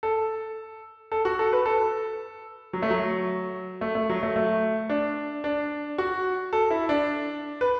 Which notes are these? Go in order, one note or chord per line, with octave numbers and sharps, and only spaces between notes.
A4
A4
F#4
A4
B4
A4
F#3
A3
F#3
A3
A3
F#3
A3
A3
D4
D4
F#4
A4
E4
D4
B4